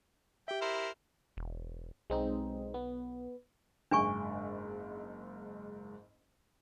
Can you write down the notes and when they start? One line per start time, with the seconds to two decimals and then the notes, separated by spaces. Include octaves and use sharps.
0.48 G4 E5 G5
0.61 E4 A#4 C5
1.37 E1
2.10 B1 G#3 C4 D#4
2.74 B3
3.91 F#1 G#2 D4 G#5 C#6